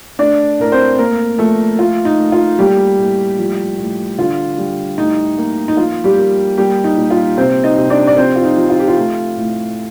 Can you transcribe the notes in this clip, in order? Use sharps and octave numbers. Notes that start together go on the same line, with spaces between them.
A3 D4 D5
A2 A#4
C4 C5
A3 A#3 A#4
F3 A3 A4
A3 F4
D#4
A3
F4
G3 A#3 G4
A2
F3
A2
D3 F4
G3
A2 D#4
A#3
D#4
F3 F4
G3 G4
A#3
G3 A#3 G4
D#4
A#2
F4
C3 C4 C5
D#4 D#5
C3
D4 D5
D5
F3 C4 C5
F4
D#4
F3
F4
G4
F4
A3
A2